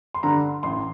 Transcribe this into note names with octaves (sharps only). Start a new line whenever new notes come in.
C6
G2 D3 A#5
A1 C6